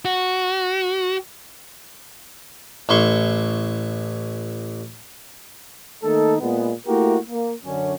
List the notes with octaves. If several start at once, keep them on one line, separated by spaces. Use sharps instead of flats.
F#4
A1 E4 C6 C#6
D#3 A3 A#3 D#4 A4
A#2 G#3 B3
A3 A#3 E4 F#4 G4 A#4
A#3
F#2 D3 C#4